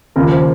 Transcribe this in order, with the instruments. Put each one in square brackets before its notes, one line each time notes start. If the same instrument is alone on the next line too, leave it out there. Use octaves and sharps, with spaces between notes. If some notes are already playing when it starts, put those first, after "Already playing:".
[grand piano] D#2 C#3 F3 A#4
C5